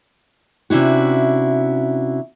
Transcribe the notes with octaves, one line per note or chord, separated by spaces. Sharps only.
C3 C#4 D4 E4 F#4